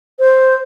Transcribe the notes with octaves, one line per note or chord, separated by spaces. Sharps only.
C5